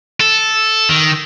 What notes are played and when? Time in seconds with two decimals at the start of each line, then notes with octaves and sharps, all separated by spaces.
0.20 A4
0.89 D#3